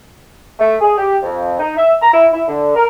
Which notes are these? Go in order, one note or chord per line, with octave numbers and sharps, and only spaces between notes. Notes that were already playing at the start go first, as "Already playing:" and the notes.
A3
G#4
G4
F2
D#4
E5
A#5
E4
E4
D3
A#4